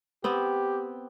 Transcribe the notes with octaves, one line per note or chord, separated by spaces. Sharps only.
B3 C4 G4